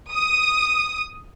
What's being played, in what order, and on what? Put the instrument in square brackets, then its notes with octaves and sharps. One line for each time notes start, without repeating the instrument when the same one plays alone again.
[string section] D#6